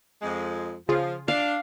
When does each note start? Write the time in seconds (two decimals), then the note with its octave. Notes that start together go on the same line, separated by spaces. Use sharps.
0.22 F2 G#3
0.89 C#3 F3 F4 G#4
1.28 D4 F5